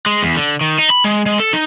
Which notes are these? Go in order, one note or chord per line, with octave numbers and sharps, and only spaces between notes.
G#3
E2
D3
D#3
D#4
B5
G#3
G#3
A4
D#4